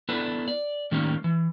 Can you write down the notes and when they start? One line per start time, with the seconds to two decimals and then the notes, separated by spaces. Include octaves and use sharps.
0.09 B3 D4 E4 A4 B4
0.48 D5
0.91 A2 D#3 G3 A#3 C#4
1.24 E3